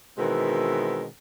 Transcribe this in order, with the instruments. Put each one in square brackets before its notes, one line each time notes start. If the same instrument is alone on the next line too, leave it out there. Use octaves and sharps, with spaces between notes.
[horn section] B2 D#3 E3 G#3 B3 C4